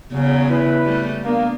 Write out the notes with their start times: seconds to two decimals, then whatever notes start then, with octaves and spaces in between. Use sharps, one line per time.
0.13 E2 C#3 F#3
0.49 E4 B4
0.85 G3 A3
1.24 A#3 B3 D4